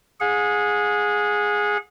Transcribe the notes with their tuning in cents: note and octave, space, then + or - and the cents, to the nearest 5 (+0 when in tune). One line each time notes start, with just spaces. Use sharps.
G#4 +0 F#5 -40